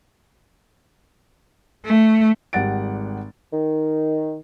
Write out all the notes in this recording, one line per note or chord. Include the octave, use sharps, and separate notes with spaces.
A3
G#1 G3 F#5 A6 D7
D#3